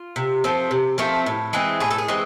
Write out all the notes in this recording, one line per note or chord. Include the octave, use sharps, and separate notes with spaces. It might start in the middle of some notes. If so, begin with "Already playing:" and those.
Already playing: F4
C3
F3 A3 C4
C3
F3 A3 C4
A2
E3 G#3 C4
A2 G#4
A4
G#4
E3 G#3 C4